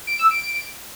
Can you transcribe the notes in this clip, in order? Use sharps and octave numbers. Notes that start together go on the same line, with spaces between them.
D7
E6
D7